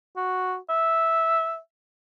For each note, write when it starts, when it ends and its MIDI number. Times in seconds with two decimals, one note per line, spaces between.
0.17 0.57 66
0.69 1.58 76